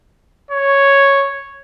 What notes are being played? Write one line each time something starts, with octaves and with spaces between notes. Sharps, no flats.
C#5